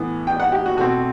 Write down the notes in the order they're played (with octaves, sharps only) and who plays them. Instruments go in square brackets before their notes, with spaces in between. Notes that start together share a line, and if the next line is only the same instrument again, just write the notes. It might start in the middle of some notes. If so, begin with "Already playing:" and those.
Already playing: [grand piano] A2 E3 B3
[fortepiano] G5
F#5
G4
F#4
[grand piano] B2 A3 C4 [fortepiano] F#4